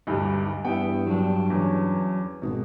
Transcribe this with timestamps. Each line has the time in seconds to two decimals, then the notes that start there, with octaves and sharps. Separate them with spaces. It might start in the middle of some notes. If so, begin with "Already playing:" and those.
0.07 D2 G2 G3 D#4
0.65 G2 B3 E4 G5
1.07 F#3 D4
1.50 E2 C#4
2.42 G#1 B2